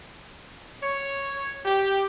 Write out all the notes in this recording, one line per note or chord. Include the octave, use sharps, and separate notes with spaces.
C#5
G4